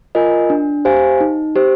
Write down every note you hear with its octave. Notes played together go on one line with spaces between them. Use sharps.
F4 A#4 D#5 G#5
D4
G4 C5 F5 G#5
D#4
G4 C5